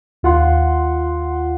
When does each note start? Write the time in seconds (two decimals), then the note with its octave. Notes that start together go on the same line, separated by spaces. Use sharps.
0.23 D#2 F4 F#5 C6